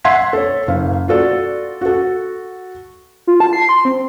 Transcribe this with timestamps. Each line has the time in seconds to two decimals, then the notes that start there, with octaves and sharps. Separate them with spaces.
0.04 E5 F#5 C6 G#6 B6 C7
0.33 A4 C#5
0.67 F#1 F5
1.08 F4 F#4 A4 D5
1.81 F#4 A4
3.27 F4
3.40 A5
3.53 C7
3.69 C6
3.85 C4